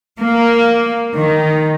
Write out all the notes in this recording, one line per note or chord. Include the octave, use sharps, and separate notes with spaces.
A#3
D#3